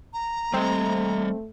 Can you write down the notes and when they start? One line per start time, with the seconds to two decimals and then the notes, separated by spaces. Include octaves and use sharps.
0.13 A#5
0.53 G3 A3 C4 D#5